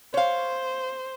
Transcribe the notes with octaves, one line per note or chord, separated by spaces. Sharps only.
C5 C#5 F5